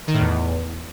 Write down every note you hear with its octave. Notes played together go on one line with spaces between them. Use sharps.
D#3
A2
E2